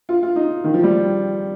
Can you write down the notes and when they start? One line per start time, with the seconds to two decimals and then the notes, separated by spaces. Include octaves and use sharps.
0.09 F4
0.23 F4
0.36 D#4
0.64 D#3
0.74 F3
0.84 G3